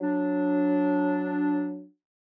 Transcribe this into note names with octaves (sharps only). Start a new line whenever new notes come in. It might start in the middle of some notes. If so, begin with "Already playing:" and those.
F#3 D4